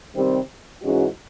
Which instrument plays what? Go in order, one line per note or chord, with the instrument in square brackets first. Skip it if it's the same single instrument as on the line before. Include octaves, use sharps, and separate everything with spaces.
[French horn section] C3 D#3 G3 C4
G#2 E3 G#3 C#4 F#4